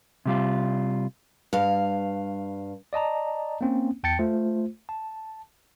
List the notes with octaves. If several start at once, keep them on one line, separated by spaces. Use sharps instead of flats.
C3 G3 F4
G2 F5
D5 D#5 A5 A#5
A#3 C4 C#4
E2 G5 A5 A6 C#7
A3 F4 C5
A5